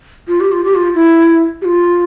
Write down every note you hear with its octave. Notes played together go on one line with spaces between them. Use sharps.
F4
G4
F4
G4
F4
E4
G4
F4